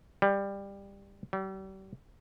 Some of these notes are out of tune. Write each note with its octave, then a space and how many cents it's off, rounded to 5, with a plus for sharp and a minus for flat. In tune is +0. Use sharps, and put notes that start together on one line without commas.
G3 +15
G3 -40